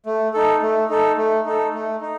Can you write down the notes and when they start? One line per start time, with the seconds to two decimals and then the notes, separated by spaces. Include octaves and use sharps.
0.06 A3
0.34 D#4 A4
0.62 A3
0.89 D#4 A4
1.17 A3
1.46 D#4 A4
1.74 A3
2.01 D#4